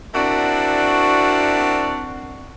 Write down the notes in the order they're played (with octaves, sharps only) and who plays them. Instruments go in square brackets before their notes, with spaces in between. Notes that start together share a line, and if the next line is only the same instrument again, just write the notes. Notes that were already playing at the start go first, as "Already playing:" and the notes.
[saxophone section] C4 D4 E4 F#4 A#4 D5